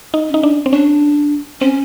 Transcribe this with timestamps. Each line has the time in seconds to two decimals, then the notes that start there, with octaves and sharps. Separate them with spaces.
0.14 D#4
0.29 C#4
0.34 D#4
0.43 D4
0.66 C4
0.73 C#4 D4
1.61 C4 C#4